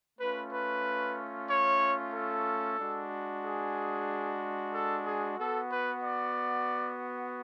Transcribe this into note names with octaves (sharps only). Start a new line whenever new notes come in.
A3 C#4 F4 B4
B4
C#5
A4
G#3 D4 F#4
G#4
A4
G#4
B3 F#4 A4
B4
D5